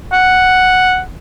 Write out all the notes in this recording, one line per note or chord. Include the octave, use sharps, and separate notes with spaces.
F#5